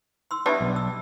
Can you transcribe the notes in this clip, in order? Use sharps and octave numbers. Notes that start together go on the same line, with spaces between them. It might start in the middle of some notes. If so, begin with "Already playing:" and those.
C6 E6
G3 B3 D4 G4 D5 E5
B1
E6